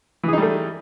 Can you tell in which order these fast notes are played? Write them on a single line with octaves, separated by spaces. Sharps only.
E3 G#4 D#4 G3 A3